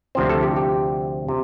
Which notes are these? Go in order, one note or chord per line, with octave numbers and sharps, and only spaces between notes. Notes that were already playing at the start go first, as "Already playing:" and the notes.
D2 C3 F3 C4 C5
A4
G4
G4
C3